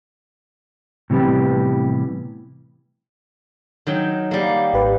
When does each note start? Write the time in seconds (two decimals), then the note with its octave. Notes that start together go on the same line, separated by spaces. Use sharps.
1.10 A2 C3 E3 G3 B3 G4
3.87 D#3 F#3 G5
4.31 G3 A#3
4.73 G#1 G4 B4